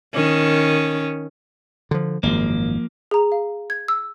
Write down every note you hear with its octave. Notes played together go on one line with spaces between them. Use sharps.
D#3 C#4
D3 F3
G#1 F#2 F3 A#3
G#4 A#5
F5
G#6
E6